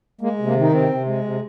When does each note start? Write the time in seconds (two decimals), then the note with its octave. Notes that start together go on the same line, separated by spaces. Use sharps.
0.21 G#3 A#3
0.39 C3
0.46 A#3
0.55 D#3
0.61 D#4
0.72 C3 C4
0.89 C3
1.06 G#3
1.24 C3